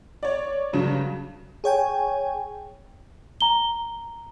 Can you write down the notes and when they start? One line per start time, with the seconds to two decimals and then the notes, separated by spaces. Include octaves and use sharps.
0.23 C#5 D5
0.73 G2 C#3 F#3
1.64 G#4 C#5 G5 G#5
3.41 A#5 G7